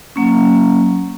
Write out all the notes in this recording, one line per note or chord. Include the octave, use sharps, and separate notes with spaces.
F#3 A#3 C#4